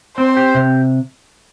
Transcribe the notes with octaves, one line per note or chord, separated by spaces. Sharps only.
C4 C5
G4
C3